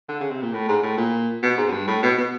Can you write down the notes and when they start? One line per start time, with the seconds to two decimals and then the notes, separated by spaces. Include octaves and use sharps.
0.08 D3
0.20 C#3
0.31 C3
0.42 A#2
0.53 A2
0.68 G#2
0.83 A2
0.97 A#2
1.43 B2
1.57 G#2
1.68 F#2
1.72 G2
1.87 A2
2.03 B2
2.17 B2